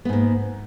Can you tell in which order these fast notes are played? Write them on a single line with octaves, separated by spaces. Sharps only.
B3 G#2 A#3